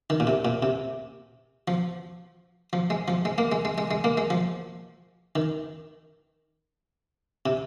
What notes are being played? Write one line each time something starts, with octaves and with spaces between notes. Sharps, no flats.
D#3
A#2
C3
A#2
C3
F3
F3
G#3
F3
G#3
A#3
G#3
G#3
G#3
G#3
A#3
G#3
F3
D#3
C3